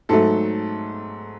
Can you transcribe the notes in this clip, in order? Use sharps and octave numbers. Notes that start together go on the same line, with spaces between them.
G#2 F#3 A3 A4